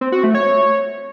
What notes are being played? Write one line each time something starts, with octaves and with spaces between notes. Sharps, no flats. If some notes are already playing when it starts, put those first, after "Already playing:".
C4
F#4
A3
C#5